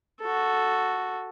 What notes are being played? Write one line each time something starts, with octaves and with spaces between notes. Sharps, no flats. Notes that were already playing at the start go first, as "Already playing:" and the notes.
F#4 A4